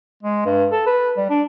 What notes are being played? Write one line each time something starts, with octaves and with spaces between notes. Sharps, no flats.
G#3
G2
A4
B4
G3
D4